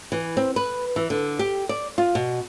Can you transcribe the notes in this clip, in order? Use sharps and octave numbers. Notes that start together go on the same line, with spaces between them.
E3
C4
B4
E3
D3
G4
D5
F4
B2